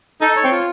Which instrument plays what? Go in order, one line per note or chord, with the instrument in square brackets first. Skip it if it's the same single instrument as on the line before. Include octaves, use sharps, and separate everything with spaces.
[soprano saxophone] D#4 [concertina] A4
[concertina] C#5
[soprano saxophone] C4
[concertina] F4